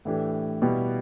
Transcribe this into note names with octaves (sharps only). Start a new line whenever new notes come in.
A2 E3 A3 D4 G4
B2 G3 B3 E4 G4